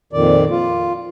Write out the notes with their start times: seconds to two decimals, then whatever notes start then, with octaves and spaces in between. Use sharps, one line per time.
0.13 F2 A#2 D#3 D5
0.51 F4